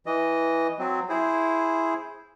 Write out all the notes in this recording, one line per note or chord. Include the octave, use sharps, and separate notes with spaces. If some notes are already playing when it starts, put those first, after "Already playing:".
E3 D#5
F#3 C4
E4 G#4 C5